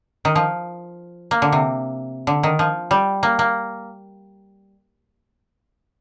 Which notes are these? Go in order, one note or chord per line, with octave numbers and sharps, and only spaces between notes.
D#3
F3
A#3
D3
C3
D3
D#3
F3
G3
A#3
A#3